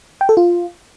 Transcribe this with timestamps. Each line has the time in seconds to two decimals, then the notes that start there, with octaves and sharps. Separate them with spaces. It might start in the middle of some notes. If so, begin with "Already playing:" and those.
0.21 G5
0.29 A4
0.37 F4